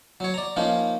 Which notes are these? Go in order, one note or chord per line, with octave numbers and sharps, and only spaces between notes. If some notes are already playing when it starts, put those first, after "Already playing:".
F#3 C#5
D5 A#5
F3 A#3 C#4 D#4